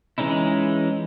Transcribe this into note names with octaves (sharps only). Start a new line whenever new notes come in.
E3 G#3 C#4 D#4 E4